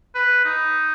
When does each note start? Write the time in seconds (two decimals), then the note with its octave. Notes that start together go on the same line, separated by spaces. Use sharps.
0.15 B4
0.45 D#4